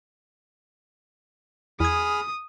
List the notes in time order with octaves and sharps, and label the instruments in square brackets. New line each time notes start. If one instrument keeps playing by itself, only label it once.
[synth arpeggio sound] E2 G#6 [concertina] G#4 B5 F6 [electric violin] D#6